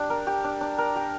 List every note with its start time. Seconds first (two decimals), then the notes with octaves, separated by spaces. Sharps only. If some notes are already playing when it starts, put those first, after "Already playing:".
Already playing: D4 G4
0.10 A#4
0.27 G4
0.44 D4
0.61 D4
0.78 A#4
0.96 G4